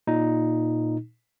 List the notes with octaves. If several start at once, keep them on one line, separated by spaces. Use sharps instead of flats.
A#2 D#4